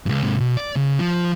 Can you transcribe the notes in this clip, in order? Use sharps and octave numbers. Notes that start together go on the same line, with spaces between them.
C#2 G2
G#2 C3
B2
D5
C#3
F3